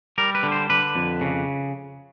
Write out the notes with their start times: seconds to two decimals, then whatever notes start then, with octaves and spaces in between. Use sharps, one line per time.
0.18 G3 A#4
0.35 B4
0.43 D3
0.52 C5
0.70 D3 B4
0.96 F2
1.21 C#3